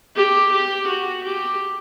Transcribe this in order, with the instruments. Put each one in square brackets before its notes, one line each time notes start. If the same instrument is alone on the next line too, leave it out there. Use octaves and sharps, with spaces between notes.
[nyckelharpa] G4
G4
F#4
G4